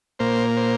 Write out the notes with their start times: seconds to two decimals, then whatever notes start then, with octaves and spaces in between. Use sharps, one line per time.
0.19 A#2 A#3 C5
0.57 C5